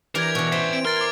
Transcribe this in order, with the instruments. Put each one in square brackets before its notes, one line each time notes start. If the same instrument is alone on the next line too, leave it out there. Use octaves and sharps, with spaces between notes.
[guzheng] E3 G4 D5 [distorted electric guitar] A#4 [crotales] G#6 F7
[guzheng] B2 E3 [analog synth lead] C#6
[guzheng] C5 [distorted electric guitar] E5 C6
[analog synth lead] C4 [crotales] D7
[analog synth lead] A#4 [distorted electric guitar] C6 [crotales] F6 A6 D7
[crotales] D6 G#6